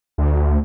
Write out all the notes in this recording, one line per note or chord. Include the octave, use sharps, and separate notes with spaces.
D2